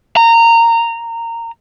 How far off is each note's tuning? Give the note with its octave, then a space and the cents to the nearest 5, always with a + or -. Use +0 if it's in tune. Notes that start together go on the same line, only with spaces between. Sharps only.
A#5 -20